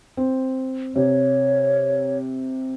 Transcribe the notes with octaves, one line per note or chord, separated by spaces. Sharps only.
C4
C3 C#5